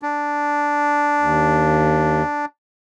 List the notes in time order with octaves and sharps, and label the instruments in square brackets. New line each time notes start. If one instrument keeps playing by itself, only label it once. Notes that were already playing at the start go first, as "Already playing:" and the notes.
[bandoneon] D4
[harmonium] D#2